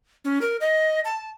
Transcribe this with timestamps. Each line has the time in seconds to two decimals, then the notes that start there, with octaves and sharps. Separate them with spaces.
0.25 C#4
0.41 A#4
0.61 D#5
1.05 A5